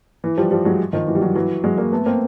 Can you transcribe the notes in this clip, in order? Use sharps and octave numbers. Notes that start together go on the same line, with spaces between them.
E3
F3 G3
F3 G3
F#3 G#3
D#3 F3
E3 F#3
G3
E3 F#3
E3 F#3
F#3 G#3
G#3 A#3
A3 B3
A#3 C4